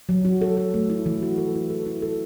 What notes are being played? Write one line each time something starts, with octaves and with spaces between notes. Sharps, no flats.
F#3
F#4
A4
A4
A3
E4
E3
F#4
A4
E4
A4
E4
A4